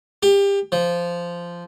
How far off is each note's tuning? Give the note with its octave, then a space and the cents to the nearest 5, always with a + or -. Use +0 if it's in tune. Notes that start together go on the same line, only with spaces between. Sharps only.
G4 +25
F3 -10